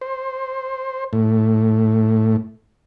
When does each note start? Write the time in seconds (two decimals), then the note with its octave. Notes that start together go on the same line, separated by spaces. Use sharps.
0.01 C5
1.13 A2